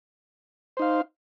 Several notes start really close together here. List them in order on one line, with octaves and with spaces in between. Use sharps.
C5 D#4 F5